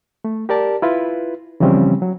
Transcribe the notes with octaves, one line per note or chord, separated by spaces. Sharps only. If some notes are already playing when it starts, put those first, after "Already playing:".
A3
G4 A#4 D5 A5
E4 F4 B4
C#3 E3 F3 G3 C4 C#4
F#3